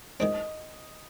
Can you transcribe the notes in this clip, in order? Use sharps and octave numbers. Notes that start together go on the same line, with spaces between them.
D#3 G#3 C4 D#5